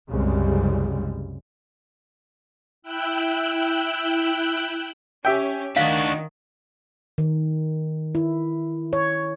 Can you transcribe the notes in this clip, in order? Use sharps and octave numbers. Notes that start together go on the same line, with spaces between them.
C2 F#2 C#3 G3 G#3
E4 G5 E6 F#6
C#4 G4 E5 G5
D#3 D4 F#4 F5
D#3
E4
C#5